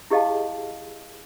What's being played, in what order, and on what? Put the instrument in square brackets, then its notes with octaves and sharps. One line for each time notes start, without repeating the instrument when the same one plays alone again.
[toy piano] E4 G4 G#4 D#5 F5 A5